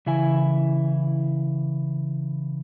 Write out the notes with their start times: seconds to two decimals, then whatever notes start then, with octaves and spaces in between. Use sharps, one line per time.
0.06 C#3 E3 E4 G#5